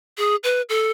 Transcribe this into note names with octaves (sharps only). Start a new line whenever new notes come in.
G#4
B4
A4